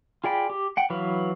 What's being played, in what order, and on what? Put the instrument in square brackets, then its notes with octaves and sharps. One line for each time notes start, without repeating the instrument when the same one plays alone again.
[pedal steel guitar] F4 G#4 D5 G5 B5
G4
F#5 G5
E3 F#3 B4 F5